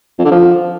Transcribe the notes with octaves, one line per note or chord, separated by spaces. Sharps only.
F2
D3
F3